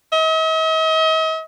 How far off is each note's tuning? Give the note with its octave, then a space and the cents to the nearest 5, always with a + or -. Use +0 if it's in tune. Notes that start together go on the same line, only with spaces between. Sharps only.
D#5 +45